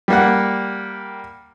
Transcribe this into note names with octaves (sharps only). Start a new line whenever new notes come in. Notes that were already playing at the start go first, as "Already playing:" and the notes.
G3 A#3 F#5